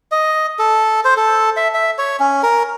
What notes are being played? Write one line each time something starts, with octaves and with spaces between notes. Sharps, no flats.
D#5
A4
C5
A4
E5
E5
C#5
C#4
A#4